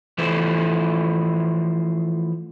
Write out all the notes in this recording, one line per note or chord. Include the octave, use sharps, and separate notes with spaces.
E3 F3 A3 E4 C5